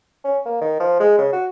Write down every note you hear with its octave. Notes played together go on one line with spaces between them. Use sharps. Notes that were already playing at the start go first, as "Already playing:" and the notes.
C#4
A#3
D#3
F3
G#3
C#3
F#4